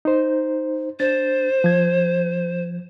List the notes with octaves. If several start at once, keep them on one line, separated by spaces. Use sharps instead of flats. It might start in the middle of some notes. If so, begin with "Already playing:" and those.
D#4 C5
D4 C5 A6
F3 G#6